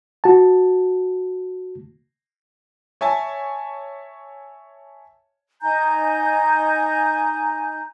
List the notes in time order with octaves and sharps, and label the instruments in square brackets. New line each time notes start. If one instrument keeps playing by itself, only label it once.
[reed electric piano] F#4 A5
[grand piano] C#5 E5 G#5 A5
[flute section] D#4 G#5 A#5 G6